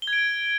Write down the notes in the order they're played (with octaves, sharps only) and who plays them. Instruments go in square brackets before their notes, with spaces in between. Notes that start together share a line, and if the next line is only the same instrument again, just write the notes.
[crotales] G7
G#6
D7